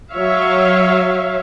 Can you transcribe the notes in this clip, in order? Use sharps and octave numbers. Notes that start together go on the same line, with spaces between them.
F#3 C#5 E5 F5